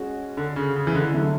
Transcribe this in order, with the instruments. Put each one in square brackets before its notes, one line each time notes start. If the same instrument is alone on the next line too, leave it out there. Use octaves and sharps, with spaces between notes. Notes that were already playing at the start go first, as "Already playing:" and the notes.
Already playing: [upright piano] G#3 C#4 F#4
[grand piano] D3
C#3
C#3
E3
D3
[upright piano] D3 F#3 A3 E4